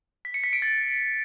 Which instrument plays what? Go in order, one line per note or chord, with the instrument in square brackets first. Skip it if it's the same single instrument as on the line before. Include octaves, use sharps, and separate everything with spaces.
[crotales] B6
C#7
B6
D7
A6